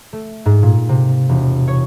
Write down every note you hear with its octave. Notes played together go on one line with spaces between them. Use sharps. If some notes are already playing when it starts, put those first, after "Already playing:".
A3
G#2
A#2
C3
E1
C#5